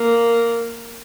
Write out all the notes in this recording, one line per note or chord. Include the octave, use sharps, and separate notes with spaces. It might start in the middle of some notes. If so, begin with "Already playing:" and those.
Already playing: A#3